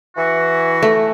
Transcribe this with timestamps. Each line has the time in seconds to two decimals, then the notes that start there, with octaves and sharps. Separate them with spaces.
0.17 E3 F#4
0.83 A3